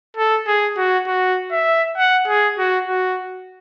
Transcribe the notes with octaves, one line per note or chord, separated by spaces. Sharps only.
A4
G#4
F#4
F#4
E5
F#5
G#4
F#4
F#4